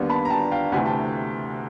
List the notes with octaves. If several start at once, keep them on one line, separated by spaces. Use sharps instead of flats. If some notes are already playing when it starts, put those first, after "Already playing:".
Already playing: D#2 D3 G3 B3
A5 B5
A#5
G5 A5
F5 G5
D2 C3 E3 A3 F#5 G#5
G5 A5